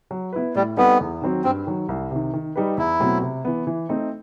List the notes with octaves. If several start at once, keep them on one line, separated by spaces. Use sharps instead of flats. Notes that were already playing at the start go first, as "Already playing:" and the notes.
F#3
B3 E4 B4
A2 G3
G3 B3 C4 D#4 A4
E2
D#3 F#3 C4 F#4
G2 C4
D#3 F#3
C2
C3 D#3
D#3
G3 D#4 G4 B4
E2 E4
B2 F#3 A3 C4
C3
E3 B3
E3
A3 C4 D#4